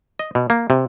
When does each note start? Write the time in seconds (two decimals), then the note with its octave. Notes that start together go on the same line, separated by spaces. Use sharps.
0.19 D#5
0.35 B2
0.50 A#3
0.70 C3